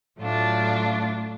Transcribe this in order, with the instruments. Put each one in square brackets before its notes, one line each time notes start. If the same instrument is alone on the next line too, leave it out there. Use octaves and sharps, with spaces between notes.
[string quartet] A2 F#3 A3 D4 F4